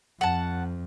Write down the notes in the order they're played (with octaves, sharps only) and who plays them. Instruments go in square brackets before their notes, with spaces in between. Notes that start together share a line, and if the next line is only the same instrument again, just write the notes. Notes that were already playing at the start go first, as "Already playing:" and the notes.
[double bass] F2 [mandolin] F#5 A5